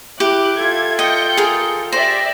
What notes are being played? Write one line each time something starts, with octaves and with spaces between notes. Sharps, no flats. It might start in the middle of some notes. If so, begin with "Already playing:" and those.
E4 G4 E5 D6 F#6
F4 A4 G#6
D#5 G5 G6 C#7
G#4 A#4 D#6
G4 C5 D5 E5 A#6